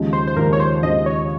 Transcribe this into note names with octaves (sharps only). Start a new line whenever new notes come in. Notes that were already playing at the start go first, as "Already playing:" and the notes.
Already playing: D#2 C#3 F3 G#3
C5
C5
D#2 C#3 F3 G#3 A#4
C#5
C5
D#2 C#3 F3 G#3 D#5
C#5